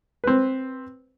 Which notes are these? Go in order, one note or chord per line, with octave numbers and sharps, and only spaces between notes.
C4 B4